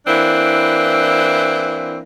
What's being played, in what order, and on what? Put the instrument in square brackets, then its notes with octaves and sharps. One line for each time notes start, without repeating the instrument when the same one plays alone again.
[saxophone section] E3 A#3 C4 D4 E4